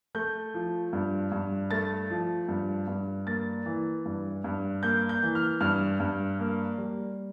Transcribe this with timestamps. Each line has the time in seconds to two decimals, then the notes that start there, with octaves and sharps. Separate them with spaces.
0.15 A3 G6
0.54 F3
0.93 G2
1.32 G2
1.71 A3 A6
2.10 F3
2.48 G2
2.88 G2
3.26 A#3 A6
3.66 E3
4.06 G2
4.44 G2
4.83 A#3 G6
5.09 G6
5.23 E3
5.35 F6
5.61 G2 F6
6.00 G2
6.39 A#3
6.78 G3